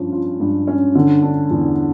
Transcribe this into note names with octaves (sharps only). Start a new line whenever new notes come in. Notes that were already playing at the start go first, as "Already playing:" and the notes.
Already playing: G2 F3 C#4
F4
G2
C#4
D3
D4
E2